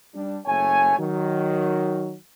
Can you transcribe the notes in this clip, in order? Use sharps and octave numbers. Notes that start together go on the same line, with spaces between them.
G3 D4
F#1 A3 C#5 G#5
D#3 F#3